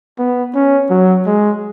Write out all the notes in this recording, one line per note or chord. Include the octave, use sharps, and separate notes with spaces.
B3
C#4
F#3
G#3